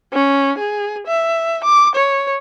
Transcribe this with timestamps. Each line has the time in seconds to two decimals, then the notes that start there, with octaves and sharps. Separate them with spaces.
0.12 C#4
0.58 G#4
1.07 E5
1.64 D6
1.95 C#5